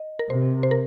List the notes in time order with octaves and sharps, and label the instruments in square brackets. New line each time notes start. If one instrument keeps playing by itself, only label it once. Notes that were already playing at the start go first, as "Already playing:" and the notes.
Already playing: [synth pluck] D#5
A#4
[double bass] C3 [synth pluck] C5
[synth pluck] C5
A#4